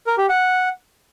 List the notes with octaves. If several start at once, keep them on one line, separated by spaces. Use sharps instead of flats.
A#4
G4
F#5